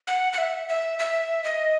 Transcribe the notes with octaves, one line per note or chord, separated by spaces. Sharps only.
F#5
F#5
E5
E5
E5
D#5